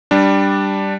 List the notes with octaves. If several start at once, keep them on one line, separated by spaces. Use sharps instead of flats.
G3 D4